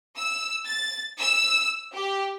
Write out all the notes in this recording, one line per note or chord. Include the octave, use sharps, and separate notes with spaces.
E6
A6
E6
G4